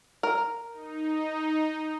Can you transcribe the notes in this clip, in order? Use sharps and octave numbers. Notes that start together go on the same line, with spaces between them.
A#4
D#4